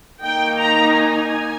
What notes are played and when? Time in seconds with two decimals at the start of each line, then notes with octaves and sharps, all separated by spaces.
0.22 D#3 A#3 D#4 G5
0.58 A#5
0.96 G#5